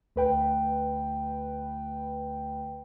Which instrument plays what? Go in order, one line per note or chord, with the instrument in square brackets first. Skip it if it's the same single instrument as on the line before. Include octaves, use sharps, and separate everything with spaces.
[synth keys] D2 B4 G5